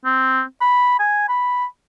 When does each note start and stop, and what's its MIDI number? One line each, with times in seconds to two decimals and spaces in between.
0.05 0.43 60
0.61 0.94 83
0.99 1.25 80
1.28 1.65 83